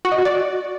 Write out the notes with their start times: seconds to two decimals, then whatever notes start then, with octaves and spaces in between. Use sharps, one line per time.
0.05 F#4
0.12 D#5
0.18 F#4
0.25 D5